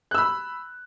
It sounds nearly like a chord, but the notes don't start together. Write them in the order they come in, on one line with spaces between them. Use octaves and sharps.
F#6 E6 B5